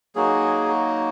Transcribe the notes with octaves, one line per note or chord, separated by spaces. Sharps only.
F#3 A#3 D#4 F#4 G#4
F#4